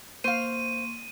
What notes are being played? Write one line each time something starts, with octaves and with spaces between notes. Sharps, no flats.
A#3 C5 F5 C6 C#6 D#7